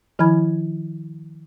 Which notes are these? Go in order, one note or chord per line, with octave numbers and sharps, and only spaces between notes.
D#3 F3 E4 G#5 B5 G#6